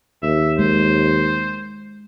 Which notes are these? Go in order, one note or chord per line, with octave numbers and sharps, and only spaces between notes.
D#2 E5
G#3 C5